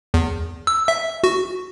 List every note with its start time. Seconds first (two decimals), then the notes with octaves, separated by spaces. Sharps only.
0.14 E2
0.67 E6
0.88 E5
1.24 F#4